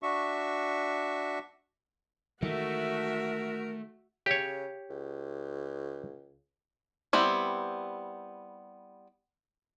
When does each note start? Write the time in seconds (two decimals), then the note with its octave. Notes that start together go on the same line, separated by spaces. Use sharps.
0.03 D4 F#4 E5 C#6
2.42 D#3 E3 G#3 A3 F#4 A#4 E5
4.26 C#3 G4 C#5
4.90 C#2
7.13 G3 B3 C4 E4